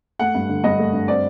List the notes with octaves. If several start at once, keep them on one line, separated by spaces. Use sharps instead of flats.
A3 F#5
G2
D3
G2 D#5
A3
G2
C4 D5